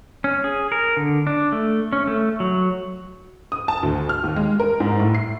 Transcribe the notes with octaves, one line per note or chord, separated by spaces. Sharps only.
C#4
G#4
A#4
D3
D4
A3
C#4
A3
F#3
D#6
A5
D2
F6
D#2
G#3
A#4
G#2
A2
C7